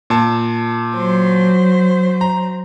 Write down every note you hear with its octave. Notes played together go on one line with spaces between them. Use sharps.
A#2 A5
F#3 C5
A#5